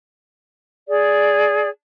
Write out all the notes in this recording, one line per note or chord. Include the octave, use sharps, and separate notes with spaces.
G#4 D5